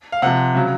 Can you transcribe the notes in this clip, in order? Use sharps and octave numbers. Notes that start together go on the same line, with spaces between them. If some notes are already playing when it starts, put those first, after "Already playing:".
F5
C3 F3 F#5
C#3 F#3